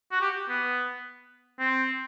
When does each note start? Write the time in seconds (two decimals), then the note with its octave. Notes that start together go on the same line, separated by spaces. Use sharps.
0.11 F#4
0.21 G4
0.49 B3
1.59 C4